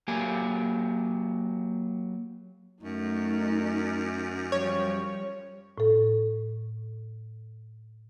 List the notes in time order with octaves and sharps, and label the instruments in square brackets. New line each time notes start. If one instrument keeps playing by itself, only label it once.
[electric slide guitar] F#3 A#3 G4 G#5
[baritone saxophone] F#2 [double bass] A3 [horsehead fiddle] D#4
[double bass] F3 G3 [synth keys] C#5
[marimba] A2 A4